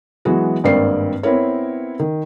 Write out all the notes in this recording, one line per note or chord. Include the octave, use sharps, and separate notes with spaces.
E3 F#3 G#3 B3 F#4
G#1 G2 A#3 C4 D5 C7
B3 C4 E4 A#4 C#5
D#3